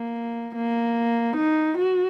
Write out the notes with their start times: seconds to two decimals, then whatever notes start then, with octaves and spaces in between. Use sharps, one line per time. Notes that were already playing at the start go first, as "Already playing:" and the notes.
Already playing: A#3
0.55 A#3
1.36 D#4
1.78 F#4